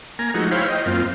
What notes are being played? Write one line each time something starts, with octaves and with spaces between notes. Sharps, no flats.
A#3 G#5 A#5
F3 G#3 A3 D#4 F#4
E4 C5 C#5 F5 G5 B5
D#5 G5
F#2 A#3 C4 F4